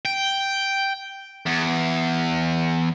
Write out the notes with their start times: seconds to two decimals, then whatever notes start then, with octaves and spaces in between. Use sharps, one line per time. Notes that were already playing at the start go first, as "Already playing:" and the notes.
0.05 G5
1.46 E2